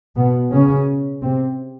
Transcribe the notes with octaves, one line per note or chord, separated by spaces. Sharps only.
B2 B3
C#3 C#4
C3 C4